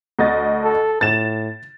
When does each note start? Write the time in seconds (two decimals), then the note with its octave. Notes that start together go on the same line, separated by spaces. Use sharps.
0.19 D2 D#5 A6
0.64 A4
1.01 A2 A6 E7